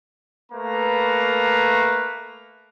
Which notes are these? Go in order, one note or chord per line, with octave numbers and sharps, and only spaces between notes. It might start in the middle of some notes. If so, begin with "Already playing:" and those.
A3 A#3 B4 A#5